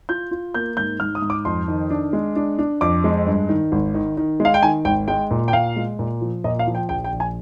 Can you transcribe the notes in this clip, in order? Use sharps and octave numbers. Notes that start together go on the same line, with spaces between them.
F4 G6
F4
A#3 G6
G#2 G6
G#2 F6
D#6
G#2
D6
F2 C6
D#3
D4
G#3
D4
D4
F2 D6
G#3
G2
D#3
G#1
D#3
D#3
G#3
F5
G5
D#3 G#5
G#1 G5
G#3 G5
A#2
G5
A#2 F5
G#3
A#2
F3
A#2 D#5
F5
F3
G5
A#1 G5
G5
A#1
G#5